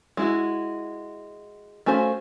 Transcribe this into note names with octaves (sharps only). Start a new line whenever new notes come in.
G#3 E4 F#4
A3 C#4 F#4 C5 F5